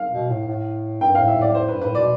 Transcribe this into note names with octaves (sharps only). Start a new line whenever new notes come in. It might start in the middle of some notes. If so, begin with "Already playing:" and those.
Already playing: F5
B2
A2
A2
G2 G5
A2 F5
E5
A2 D5
C5
B4
G2
A2 B4
B2 D5